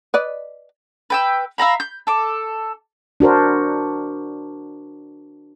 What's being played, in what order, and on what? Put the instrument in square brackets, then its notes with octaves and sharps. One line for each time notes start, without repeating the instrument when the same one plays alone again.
[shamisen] B4 D5 D#5
[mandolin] B4 G5 E6
E5 F5 A#5 B5
G6
A4 D6
[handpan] D4 F#4 A#4 C5